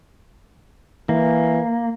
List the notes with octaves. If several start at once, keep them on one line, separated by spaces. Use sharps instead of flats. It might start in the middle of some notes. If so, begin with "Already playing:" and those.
E3 A#3